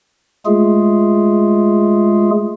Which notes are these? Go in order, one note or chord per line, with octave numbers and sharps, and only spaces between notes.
G#3 A3 F4 G#4